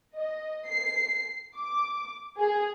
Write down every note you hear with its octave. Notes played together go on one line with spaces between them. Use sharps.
D#5
C7
D6
G#4